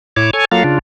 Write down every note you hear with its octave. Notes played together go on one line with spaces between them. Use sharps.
A2 E4 C#5 D6
A4 C#5 G#5
F#3 A#3 F4 A4 F5
C#3 D4 F4